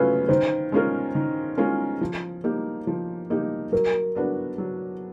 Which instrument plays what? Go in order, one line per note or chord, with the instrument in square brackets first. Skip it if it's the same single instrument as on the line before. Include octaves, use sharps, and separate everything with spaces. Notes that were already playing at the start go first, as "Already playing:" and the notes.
Already playing: [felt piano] C#3 F#3 A3 C#4 F4 [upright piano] B4
[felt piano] D#3 [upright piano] C5
[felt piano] G#3 C#4 F4 A#4
D#3
G#3 C#4 F4 A#4
F3
A#3 D#4 G4
F3
A#3 D#4 G4
[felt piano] F#3 [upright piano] A#4
[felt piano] B3 D4 F#4 B4
F#3